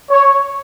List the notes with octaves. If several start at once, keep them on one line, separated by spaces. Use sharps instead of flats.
C#5